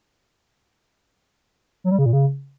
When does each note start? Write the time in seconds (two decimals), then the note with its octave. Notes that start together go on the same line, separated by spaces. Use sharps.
1.84 F#3
1.91 G3
1.99 C#3
2.06 A#2
2.13 C#3